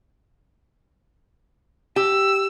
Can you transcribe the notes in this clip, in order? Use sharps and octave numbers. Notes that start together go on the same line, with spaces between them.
G4 E6